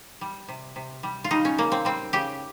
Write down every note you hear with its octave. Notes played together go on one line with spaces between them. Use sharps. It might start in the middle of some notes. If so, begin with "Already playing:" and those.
G3
C3
C3
G3
F4
G3 D#4
C#4
C#3 A#3
C4
G3 C4
C#3 G4